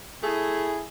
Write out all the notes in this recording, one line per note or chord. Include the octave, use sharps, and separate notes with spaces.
A3 E4 G#4